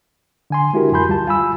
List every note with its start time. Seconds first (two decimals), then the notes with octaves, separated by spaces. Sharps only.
0.50 D3 G#5 C6
0.73 G#3 D4 E4 F#4 G4 A#4
0.92 F#2 F#4 G#5 B5 C6 G6
1.08 D2 G3 F4 A5
1.27 F4 G#5 B5 E6